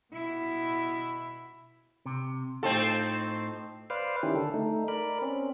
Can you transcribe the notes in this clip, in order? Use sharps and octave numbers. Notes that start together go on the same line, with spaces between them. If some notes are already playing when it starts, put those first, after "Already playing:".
B2 E4
C3
A2 C4 D#4 F4 A4
B4 C5 D5 F5
D#3 C#4 E4 G4
D3 A4
A3 D#4
A#4 D5 B5
C4 C#4